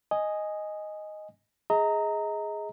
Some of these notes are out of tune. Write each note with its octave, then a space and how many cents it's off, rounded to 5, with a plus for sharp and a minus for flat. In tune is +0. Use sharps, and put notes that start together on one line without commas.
D#5 +0 G#5 +0
G#4 +0 D#5 +30 A#5 -15